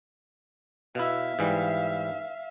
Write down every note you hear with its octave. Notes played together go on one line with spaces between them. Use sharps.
B2 E4 E5 F5
G#2 E3 G3